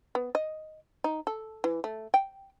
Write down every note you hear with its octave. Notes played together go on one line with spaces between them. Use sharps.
B3
D#5
D#4
A4
E3
A3
G5